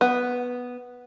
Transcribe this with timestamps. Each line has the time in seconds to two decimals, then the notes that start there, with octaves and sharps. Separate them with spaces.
0.01 B3